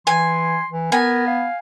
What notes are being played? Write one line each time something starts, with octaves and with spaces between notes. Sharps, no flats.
E3 G#5 C6
E3
B3 A#4 G#5
F5